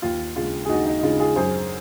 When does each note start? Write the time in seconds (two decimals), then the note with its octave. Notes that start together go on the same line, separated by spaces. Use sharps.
0.02 D#2 F4
0.36 C#3 G#3 F4
0.65 G#4
0.69 D#2 D#4 F#4
0.86 D#4
0.99 D#4
1.03 C#3 G#3 F4
1.19 F4 G#4
1.36 F#2 G#4 C5